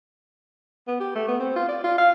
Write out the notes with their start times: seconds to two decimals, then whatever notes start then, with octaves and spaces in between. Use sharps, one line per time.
0.88 B3
1.00 G4
1.16 A3
1.28 B3
1.40 C4
1.56 F4
1.69 D5
1.84 F4
1.98 F5